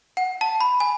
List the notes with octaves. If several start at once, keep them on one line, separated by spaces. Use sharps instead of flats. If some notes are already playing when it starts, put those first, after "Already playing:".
F#5
A5
B5
G#5